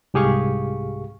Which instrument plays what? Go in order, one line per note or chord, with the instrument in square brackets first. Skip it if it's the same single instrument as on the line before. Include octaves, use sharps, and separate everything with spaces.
[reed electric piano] C2 G#2 G4 G#4 F5 C#6